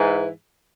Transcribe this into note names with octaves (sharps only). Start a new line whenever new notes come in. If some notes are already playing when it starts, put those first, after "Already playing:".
Already playing: G#2 E3